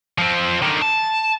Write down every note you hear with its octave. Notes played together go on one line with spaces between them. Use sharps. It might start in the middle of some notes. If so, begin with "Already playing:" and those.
F3 C4
D3 D#3
A5